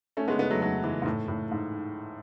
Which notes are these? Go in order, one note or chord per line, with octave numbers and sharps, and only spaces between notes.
A3 C#4
G#3 B3
G#3 B3
F#3 A3
F#3 A3
E3 G#3
G#2
A2
A2
G#2